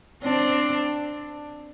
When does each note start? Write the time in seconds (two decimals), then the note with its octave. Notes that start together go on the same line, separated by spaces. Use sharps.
0.23 C4 D4